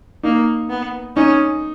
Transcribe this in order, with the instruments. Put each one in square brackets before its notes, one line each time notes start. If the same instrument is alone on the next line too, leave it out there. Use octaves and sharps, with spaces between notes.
[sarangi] A#3 [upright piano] D#4
[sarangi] B3
[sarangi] C#4 [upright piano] D#4